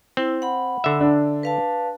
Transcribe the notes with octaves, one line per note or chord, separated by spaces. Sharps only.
C4 E4
F#5 B5
D3 E5
D4
B4 F5 A5